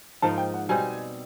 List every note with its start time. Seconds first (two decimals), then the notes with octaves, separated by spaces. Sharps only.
0.22 G#2 F3 A#3 D#4 A5
0.38 G5
0.54 F#5
0.69 B2 G3 C4 D#4 G#5